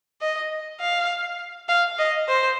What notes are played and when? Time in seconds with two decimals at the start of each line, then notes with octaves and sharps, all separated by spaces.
0.21 D#5
0.80 F5
1.69 F5
1.99 D#5
2.28 C5